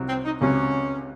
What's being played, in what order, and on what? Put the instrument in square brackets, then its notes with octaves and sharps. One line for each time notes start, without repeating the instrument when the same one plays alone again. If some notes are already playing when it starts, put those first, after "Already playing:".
Already playing: [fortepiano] C2 C3 F#3
[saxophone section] C4
D#4
[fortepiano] C#2 C3 F#3 [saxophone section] C#4